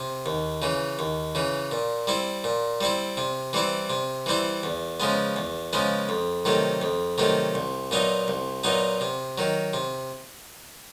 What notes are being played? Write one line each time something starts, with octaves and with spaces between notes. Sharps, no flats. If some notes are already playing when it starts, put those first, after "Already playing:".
Already playing: C3
D#2
C#3 E3
D#2
C#3 E3
A#2
G3 C4 E4
A#2
G3 C4 E4
C3
E3 G3 C4 E4
C3
E3 G3 C4 E4
E2
C#3 F3 G#3 B3
E2
C#3 F3 G#3 B3
F2
C3 D#3 F#3 A3
F2
C3 D#3 F#3 A3
C2
A#2 F#3 B3 D#4
C2
A#2 F#3 B3 D#4
C3
D#3 F#3
C3